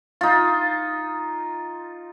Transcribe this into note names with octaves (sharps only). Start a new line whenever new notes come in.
D#4 F4